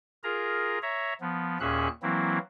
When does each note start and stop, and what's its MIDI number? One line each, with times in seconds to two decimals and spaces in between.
0.24 0.79 65
0.24 0.79 68
0.24 0.79 70
0.24 0.79 82
0.82 1.14 73
0.82 1.14 76
0.82 1.14 82
1.21 1.58 53
1.21 1.58 59
1.60 1.88 39
1.60 1.88 46
1.60 1.88 61
1.60 1.88 68
1.60 1.88 76
1.60 1.88 90
2.02 2.38 52
2.02 2.38 54
2.02 2.38 58
2.02 2.38 60
2.02 2.38 64